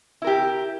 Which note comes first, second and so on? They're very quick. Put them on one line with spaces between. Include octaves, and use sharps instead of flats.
E4 A#4 G4